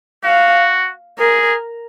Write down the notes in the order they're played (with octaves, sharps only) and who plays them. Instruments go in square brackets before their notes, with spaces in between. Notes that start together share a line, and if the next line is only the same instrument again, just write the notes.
[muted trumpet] F#4 [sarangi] F5
[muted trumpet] G#4 [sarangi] A#4